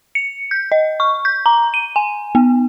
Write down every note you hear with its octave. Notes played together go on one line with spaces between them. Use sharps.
C#7
G6
D#5
C#6
G6
A#5
D#7
G#5
B3